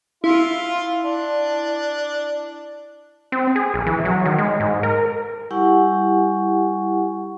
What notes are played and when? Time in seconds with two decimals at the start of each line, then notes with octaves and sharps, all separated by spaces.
0.24 E4 F4
1.03 D4
3.32 C4
3.56 G#4
3.74 A#1
3.86 E3
4.05 F#3
4.25 D#3
4.38 G#3
4.60 G#2
4.83 A#4
5.51 G3 E4 G4 F#5 G#5 C#6